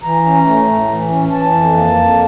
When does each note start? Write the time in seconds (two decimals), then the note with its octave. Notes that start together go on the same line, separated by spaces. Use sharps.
0.03 E3 A#5
0.25 C#4
0.46 A3
0.67 A2
0.88 E3
1.09 C#4
1.31 E3 A5
1.52 F2
1.74 A#3
1.95 F2